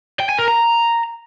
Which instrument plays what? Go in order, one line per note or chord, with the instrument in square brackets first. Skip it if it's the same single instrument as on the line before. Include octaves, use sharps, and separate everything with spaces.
[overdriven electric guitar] G5
G#5
A#4
A#5